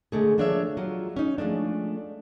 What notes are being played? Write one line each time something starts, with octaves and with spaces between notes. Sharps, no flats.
D3 G#3 A3 G#4
F3 A#3 D4 A4 C#5 E5
F#3 F4
C#4 D#4
F3 G#3 A3 D4